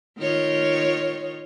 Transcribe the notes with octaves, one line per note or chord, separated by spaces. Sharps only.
D#3 F4 C#5